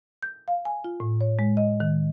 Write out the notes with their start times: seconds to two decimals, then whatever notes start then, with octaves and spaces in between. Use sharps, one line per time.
0.23 G6
0.48 F5
0.65 G#5
0.84 F4
1.00 A2
1.21 C#5
1.39 G#3
1.57 D#5
1.80 D#3